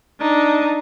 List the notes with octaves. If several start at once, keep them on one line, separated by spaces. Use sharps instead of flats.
D4 D#4